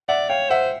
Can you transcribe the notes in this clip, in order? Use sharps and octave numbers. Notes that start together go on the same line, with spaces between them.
D5 E5 F#5
C#5 F5 G5
C5 E5 F#5